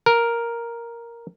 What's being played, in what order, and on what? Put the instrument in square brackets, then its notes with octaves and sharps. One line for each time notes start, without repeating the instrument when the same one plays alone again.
[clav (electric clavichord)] A#4